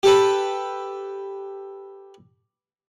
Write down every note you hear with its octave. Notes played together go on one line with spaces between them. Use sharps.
G4 A4 B4